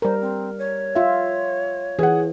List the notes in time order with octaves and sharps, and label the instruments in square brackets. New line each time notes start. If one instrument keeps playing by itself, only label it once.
[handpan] G3 A#4 [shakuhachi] C5
[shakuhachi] C4
C#5
[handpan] F4 E5
[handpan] E3 [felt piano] G#4 F#5